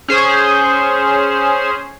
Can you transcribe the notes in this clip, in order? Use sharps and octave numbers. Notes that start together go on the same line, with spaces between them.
C#4 G#4 C5